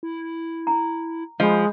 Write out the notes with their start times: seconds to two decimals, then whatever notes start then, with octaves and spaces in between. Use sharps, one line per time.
0.03 E4
0.67 A#5
1.40 F3 G#3 D#5 B5